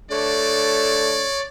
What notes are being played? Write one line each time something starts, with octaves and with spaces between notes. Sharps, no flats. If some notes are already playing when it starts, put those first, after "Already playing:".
A3 D4 C#5 D5